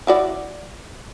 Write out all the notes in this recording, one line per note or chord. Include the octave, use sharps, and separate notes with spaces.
E4 F#4 D5